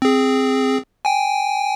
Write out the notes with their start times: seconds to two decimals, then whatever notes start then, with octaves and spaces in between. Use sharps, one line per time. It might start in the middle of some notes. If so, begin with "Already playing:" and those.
0.02 C4 G#4
1.05 G5 G#5